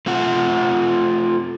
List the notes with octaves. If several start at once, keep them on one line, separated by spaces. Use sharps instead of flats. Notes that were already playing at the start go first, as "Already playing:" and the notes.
A3 C4 F4 F#5